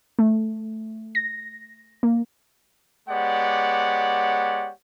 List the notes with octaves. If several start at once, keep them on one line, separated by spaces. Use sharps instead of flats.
A3
A#6
A#3
G#3 B3 G4 C#5 D5 F#5